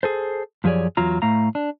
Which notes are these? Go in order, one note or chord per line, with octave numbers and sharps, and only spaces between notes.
G#4 A4 C5
F#2 F3 G4 G#4 C#5 D5
E2 F#3 F4 A#5
A2 A3 F5 A#5
D4